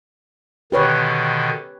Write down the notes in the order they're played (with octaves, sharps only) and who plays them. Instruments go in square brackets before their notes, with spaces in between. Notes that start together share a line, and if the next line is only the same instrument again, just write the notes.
[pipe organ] B2 D3 D#3 [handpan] G4 B4 C#5